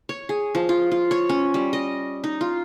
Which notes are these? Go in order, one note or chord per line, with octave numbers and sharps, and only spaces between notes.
C#5
G#4
F3
F4
F4
C#5
C#4
G3
D#5
D#4
F4